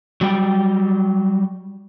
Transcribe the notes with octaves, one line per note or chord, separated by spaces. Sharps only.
F#3 G3 G5